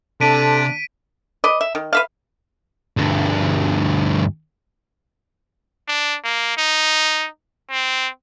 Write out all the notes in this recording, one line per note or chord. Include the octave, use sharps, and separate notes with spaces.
C3 C4 D4 A4 B6 D7 D#7
B4 D5 D#5
E5
D#3
B4 E5 F5
D2 G2
D4
A#3
D#4
C4